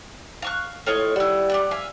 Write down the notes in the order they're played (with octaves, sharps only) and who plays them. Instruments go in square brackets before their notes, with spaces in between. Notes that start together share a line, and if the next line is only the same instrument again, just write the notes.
[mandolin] F5 C#6 F#6
[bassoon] A2 [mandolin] F4 C#5 D#5
[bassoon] G3 [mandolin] E4 F#5
[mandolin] G4 D5 F#5
E5 F5 G#5